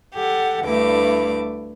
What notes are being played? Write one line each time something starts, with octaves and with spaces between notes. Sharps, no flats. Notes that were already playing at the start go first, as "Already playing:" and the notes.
G4 A4 F#5
D2 G2 A3 E4 D6